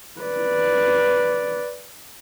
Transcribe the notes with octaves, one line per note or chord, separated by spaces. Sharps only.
B4 D5